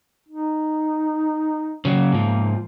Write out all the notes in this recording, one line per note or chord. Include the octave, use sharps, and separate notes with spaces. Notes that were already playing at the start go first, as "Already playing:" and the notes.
D#4
C#3 F#3 A#3
G#2 F3